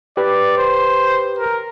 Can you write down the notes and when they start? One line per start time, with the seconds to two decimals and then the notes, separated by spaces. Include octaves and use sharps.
0.17 G4 B4 D5
0.58 C5
1.39 A#4